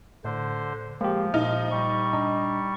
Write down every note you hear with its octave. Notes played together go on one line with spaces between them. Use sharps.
A2 D3 C5
F3 G#3 A#3 G4
A#2 D#4 F6
G3 C#6
D4 D#5 A#5